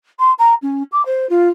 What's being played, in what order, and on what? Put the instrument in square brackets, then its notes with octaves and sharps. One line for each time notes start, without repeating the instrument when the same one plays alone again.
[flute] C6
A#5
C#4
D6
C5
F4